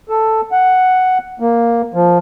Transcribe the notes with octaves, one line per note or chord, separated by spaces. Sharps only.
A4
F#5
A#3
F3